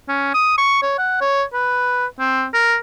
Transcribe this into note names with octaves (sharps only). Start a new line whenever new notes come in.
C#4
D#6
C#6
C#5
F#5
C#5
B4
C4
A#4